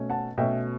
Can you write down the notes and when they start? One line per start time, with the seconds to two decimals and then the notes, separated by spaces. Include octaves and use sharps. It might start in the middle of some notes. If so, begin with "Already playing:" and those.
Already playing: B2 A3 C#4
0.10 F#5 A5
0.38 B2 A3 C#4 E5 G5